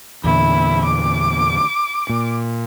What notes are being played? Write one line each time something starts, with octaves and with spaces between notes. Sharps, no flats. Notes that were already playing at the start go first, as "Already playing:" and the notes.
E2 A#2 D3 E4
D6
A#2